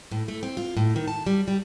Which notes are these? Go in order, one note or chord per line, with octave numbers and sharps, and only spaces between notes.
A2
A3
C4
F4
A2
D#3
A5
G3
G3